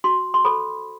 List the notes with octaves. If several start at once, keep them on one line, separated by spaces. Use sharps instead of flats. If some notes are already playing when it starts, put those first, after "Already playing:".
F#4 C6
C6
A4 C5 B5